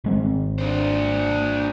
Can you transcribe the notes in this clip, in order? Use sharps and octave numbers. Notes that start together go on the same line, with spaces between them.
G#1 G#3 C4
D4 C5